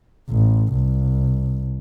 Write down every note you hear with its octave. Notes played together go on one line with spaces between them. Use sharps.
A1
C2